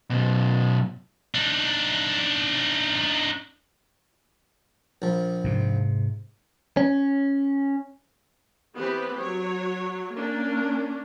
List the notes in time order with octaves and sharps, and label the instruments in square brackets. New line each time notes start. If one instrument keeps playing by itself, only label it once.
[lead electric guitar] F#2 B2
[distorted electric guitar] D4 D#4
[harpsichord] A#1 F3
[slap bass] G#2 C3
[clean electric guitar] C#4
[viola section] E3 B3 C4 G4 B4
F#3 C#5
A#3 C#4 D4